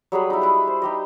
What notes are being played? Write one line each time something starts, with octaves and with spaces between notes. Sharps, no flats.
F#3 G3 G#4 B4
D#4 E4
E4 B4
C5
D#4 G4 D#5